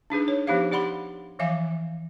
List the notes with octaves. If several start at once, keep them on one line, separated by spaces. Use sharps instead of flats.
D4 D#4 G#4 B4
C#5
F3 B3 D#4 G4 C5 F5
G4 D5 F#5 B5 C6
E3 F3 E5 F5 G#5